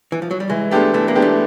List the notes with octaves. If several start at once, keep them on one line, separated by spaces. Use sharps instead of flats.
E3
F3
F#3
G3
E3 G#3
G#3 A3 B3 D4 G4
E3 A3
A#3
G#3 B3 D4 G4
A3